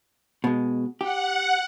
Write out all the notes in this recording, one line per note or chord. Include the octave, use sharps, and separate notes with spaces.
B2 G#3
G4 F#5